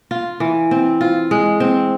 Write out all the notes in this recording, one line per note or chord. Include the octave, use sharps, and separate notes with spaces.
F4
E3
C4
F4
G#3
C4